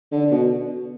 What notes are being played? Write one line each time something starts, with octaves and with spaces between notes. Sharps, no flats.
D3
D3
B2